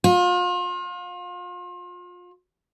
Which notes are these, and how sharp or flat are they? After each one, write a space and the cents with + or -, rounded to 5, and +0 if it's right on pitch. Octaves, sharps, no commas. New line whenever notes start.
F4 +35